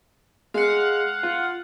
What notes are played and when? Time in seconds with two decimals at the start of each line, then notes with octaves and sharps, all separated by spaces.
0.54 G#3 F5 F#5
1.23 F4